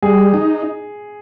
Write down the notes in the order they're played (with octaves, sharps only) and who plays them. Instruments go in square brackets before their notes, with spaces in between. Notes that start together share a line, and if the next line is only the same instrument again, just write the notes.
[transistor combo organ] G3 [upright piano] G#4
[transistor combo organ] D#4